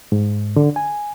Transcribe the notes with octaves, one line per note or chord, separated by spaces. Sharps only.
G#2
D3
G#5